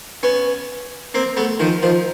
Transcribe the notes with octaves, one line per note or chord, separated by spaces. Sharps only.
B3 C#4
A#3 C4
A3 B3
D#3 F3
D#3 F3